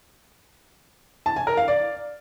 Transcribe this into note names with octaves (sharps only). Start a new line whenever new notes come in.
A5
G#5
A#4
F5
D5